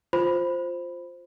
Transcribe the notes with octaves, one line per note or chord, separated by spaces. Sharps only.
F4 C5 B5